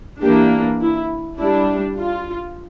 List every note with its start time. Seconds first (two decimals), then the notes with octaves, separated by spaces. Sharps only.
0.22 E3 A#3 D4 G4
0.82 E4
1.39 G3 D4 E4
1.98 F4